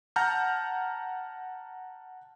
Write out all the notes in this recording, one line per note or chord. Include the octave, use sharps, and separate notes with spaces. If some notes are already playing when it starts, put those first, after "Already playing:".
F#5 A5 A#5 F6 G6